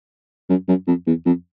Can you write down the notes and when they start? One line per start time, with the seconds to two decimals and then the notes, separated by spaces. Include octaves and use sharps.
0.49 F#2
0.68 F#2
0.87 F2
1.07 E2
1.26 F2